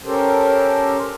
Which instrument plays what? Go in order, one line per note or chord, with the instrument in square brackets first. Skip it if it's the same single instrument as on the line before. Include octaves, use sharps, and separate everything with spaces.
[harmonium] C#4 G4 A4 A#4 C5